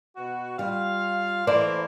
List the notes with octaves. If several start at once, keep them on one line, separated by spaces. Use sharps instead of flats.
B2 F#4
G3 F4 F5
E3 A3 A#3 C5 D5